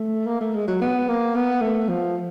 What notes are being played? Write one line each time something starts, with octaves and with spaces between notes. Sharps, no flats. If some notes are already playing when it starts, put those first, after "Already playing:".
Already playing: A3
A#3
A3
G#3
F#3
B3
A#3
B3
A3
F3